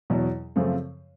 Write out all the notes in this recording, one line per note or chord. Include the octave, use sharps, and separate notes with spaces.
E2 B2 F#3
F#2 C#3 F3 A3 C4